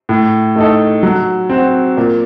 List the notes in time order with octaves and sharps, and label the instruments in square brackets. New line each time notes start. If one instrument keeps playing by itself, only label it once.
[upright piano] A2
A3 D#4 A4
F#3
C4 F#4
A#2